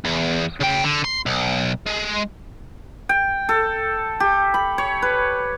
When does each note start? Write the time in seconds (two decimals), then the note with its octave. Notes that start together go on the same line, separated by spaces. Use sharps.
0.05 E2
0.61 C#3 G5
0.84 D3
1.04 C6
1.26 B1
1.87 G#3
3.09 G5
3.49 A4
4.20 G4
4.54 B5
4.78 C#5
5.02 B4